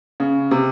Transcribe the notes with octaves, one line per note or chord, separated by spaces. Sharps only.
C#3
C3